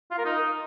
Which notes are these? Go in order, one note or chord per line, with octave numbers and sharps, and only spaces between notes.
F4
A#4
D#4